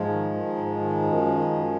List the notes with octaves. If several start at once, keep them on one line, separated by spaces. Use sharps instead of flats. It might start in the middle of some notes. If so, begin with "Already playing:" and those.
Already playing: G#2 F3 G#3
D#3
D#3
G#2
D#3
F#2
D#3
F#2